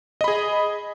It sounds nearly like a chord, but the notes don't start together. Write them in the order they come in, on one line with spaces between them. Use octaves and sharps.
D#5 B5 G#4